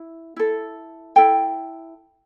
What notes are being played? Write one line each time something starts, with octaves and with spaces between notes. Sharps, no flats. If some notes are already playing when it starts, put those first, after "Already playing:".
Already playing: E4
E4 A4
E4 A4 G5